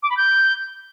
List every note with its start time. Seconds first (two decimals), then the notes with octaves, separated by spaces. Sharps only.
0.03 D6
0.10 B5
0.17 G6